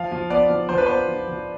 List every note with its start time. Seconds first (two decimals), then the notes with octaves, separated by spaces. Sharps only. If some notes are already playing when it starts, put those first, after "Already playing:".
Already playing: F3 F5
0.12 F3
0.30 B3 D5
0.49 F3
0.69 F3 C5
0.78 B4
0.86 B3 C5
1.08 F3
1.28 F3